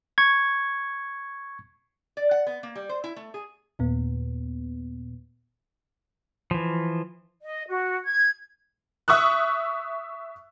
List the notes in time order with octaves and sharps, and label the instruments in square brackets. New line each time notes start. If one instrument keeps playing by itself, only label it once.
[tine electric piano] C#6 G#6
[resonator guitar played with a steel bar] D5
F#5
B3
A#3
G3
C5
E4
A3
G#4
[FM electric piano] D#2 A#2 B3
[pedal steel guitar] E3 F3
[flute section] D#5
F#4
G#6
[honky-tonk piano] E5 C#6 D#6 E6 F#6